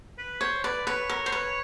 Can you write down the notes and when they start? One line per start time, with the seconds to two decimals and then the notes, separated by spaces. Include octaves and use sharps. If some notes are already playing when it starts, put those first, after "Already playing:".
0.18 B4
0.41 C5 C#5
0.63 B4 D5
0.86 B4 C#5
1.10 A#4
1.26 C5
1.32 B4